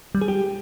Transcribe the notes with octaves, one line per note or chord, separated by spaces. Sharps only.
G3
G#4
G4